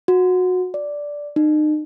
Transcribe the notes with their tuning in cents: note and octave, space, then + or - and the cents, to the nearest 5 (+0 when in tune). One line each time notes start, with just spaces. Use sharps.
F#4 -20
D5 -5
D#4 -35